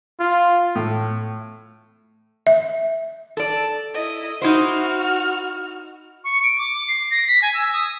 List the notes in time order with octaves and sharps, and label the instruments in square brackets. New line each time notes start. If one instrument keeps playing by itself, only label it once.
[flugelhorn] F4
[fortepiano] A2
[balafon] E5
[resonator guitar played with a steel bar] A4 D5
[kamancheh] E4 D#5
[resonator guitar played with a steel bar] D#4 E4 C5 [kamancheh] F#4 F6
[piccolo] C#6
D7
D6
C7
A#6
B6
G#5
E6
D#6